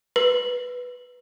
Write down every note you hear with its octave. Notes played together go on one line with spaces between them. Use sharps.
B4